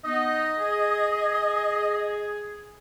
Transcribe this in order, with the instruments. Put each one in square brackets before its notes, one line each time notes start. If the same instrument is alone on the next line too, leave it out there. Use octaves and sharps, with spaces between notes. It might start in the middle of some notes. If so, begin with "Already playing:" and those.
[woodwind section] B3 D#4 [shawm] D#5
[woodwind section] G#4